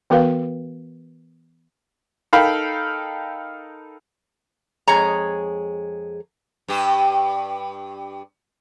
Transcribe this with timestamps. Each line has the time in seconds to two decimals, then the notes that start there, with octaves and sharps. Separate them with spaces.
0.10 E3 B3 F#4 A#4 B4 F5
2.33 D#4 A4 A#4 F5 G5 B5
4.88 F2 G#3 G#4 C#5 A#5
6.68 G2 G4